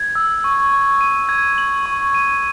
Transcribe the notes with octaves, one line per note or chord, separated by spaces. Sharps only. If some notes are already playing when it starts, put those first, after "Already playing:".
Already playing: G#6
E6
C#6
C#6
D#7
G#6
F#7
C#6
D#7